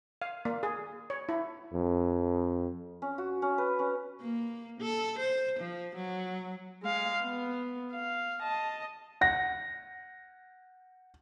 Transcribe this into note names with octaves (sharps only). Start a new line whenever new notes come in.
F5
A#3
G#4
C#5
E4
F2
C#4
F#4
C#4
B4
C#4
A#3
A4
C5
F3
F#3
G#3 F5
B3
F5
D#5 A5
F#5 A#6